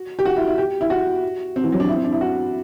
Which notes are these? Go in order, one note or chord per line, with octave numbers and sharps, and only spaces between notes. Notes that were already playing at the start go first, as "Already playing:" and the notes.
Already playing: F#4
G4
F#4
E4
E4
G4
E4
F#4
C4
E3
F#3
D4
E4
C4
D4
E4
F#4